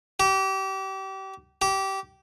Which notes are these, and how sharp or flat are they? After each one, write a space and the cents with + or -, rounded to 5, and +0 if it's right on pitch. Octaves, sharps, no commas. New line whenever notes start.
G4 -30
G4 -20